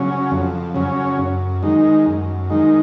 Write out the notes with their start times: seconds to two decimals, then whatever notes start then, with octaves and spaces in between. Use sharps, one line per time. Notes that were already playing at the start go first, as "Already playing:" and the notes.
Already playing: C#3 F#3 C#4
0.31 F2
0.74 C#3 F#3 C#4
1.18 F#2
1.63 D#3 G#3 D#4
2.06 F#2
2.50 D#3 G#3 D#4